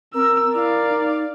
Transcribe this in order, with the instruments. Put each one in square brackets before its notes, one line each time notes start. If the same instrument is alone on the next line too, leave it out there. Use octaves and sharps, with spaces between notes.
[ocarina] C4 [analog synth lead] A#4 [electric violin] E6
[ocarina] E4 [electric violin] D5 F5
[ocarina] D#4